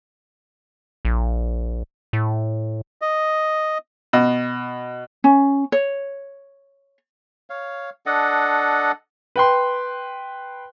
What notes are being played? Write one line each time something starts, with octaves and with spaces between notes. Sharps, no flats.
A#1
A2
D#5
B2
C#4
C#5
C#5 F5
D4 A4 D#5 F#5
B4 G5 C6